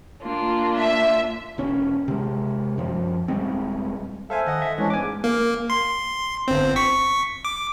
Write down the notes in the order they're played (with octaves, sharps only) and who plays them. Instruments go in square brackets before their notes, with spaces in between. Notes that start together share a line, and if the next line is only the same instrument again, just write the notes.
[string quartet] A#3 D4 F4
[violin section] E5
[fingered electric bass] E1 C#4
C3 G#3
F#2 F3
D#1 G3 G#3 C4
[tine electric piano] A4 C5 G#5 [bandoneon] E5 F5
[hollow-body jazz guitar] D#3 [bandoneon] D#5 F#5
[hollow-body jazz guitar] E5
[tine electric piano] E3 [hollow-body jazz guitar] G#3 [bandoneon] C#4 D4
[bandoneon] E2 G#2 [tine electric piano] G#5 D6
[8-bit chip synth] A#3
C6
G1 C4
C#6 B6
D6